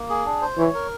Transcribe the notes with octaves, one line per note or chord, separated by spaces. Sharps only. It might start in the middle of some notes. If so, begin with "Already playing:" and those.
Already playing: A#3
G#4
D4
C5
E3 C#5
A#4